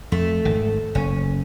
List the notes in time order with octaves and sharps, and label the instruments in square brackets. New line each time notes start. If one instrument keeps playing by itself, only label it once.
[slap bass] F2 [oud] A3
[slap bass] G#1 D#3
[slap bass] F#1 [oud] C#4